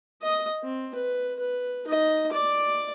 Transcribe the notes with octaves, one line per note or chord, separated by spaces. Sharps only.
D#5 D#6
C4
B4
B4
D#4 D#5
D5 D6